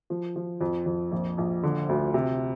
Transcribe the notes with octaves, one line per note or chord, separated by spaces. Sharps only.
F3
F3
F2
F2
A#1
A#1
D3
D2
C3